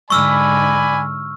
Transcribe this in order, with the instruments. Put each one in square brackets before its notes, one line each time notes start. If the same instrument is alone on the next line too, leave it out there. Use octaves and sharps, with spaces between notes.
[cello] G#2 D3 [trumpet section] D5 G#5 B5 [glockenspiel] C#6 E6 F6